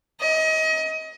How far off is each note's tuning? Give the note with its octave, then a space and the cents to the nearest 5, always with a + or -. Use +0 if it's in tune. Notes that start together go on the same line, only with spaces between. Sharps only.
D#5 +30